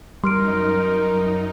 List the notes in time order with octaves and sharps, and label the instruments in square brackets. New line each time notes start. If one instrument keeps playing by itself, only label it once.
[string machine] F#2 D#4 [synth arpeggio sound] G3 [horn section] A#4 [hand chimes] C6 F6 D7